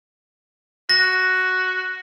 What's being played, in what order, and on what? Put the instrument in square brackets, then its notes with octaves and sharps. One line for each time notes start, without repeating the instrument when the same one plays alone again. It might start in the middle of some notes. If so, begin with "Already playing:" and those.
[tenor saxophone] F#4 [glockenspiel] A#6